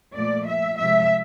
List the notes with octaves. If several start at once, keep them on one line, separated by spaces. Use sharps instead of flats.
A#2 F3 A3 D5
E5
C3 F3 G#3 E5